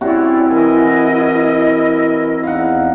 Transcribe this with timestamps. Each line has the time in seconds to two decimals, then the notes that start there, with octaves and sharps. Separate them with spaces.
0.01 C3 C#4 E4 F#4 C#5 D5 E5
0.50 E3 A#4 D#5 G#5
2.43 E2 D#4 F5 F#5